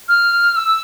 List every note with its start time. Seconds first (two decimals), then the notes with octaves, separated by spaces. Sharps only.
0.08 F6
0.56 E6